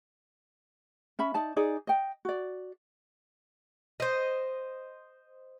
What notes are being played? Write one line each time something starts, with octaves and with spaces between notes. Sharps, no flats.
C#4 E5 B5
D#4 D5 A5
D#4 G#4 D5
D#5 G5
F#4 D5
C5 D#5